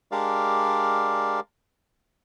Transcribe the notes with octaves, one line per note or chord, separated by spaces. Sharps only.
G#3 D4 G4 A#4 D5 F5